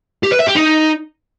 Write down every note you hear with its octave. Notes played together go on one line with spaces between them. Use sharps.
G4
B4
E5
G4
D#4